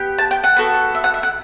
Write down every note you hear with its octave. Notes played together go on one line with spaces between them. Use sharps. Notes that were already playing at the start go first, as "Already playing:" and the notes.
Already playing: B3 G4
A5
G5
F#5
B3 F#4 A4
E5
F#5
E5
F#5